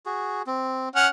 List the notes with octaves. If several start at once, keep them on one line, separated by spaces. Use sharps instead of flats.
F#4 G#4
C4
C#4 F#5 F6